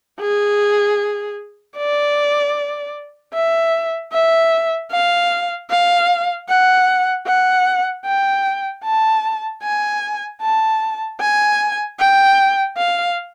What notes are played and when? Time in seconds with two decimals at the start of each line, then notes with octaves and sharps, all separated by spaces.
0.20 G#4
1.77 D5
3.34 E5
4.13 E5
4.92 F5
5.70 F5
6.49 F#5
7.27 F#5
8.05 G5
8.84 A5
9.63 G#5
10.41 A5
11.20 G#5
11.99 G5
12.77 F5